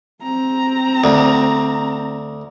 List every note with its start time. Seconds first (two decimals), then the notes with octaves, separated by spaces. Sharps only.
0.23 C4 A#5
1.04 D2